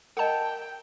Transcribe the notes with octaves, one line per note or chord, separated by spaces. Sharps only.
A#4 D#5 F#5 G5 A5